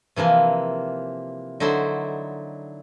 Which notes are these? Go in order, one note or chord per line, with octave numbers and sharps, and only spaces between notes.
C3 E3 F3 A#3
D3 F#3 D#4 E4 C5 C6